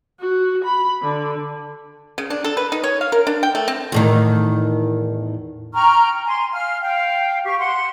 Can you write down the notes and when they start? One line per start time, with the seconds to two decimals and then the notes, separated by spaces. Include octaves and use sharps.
0.20 F#4
0.65 B5
1.02 D3
2.18 C#3
2.30 D4
2.44 A4
2.57 B4
2.72 D#4
2.84 C#5
3.01 F5
3.12 A#4
3.27 D4
3.43 G5
3.55 A3
3.68 C4
3.92 E2 A2 D#3
5.73 G5 A#5 C#6 F6
6.26 G#5 C6
6.51 F5 F6
6.81 F5 G5
7.44 G4 C#6
7.58 F#5 C6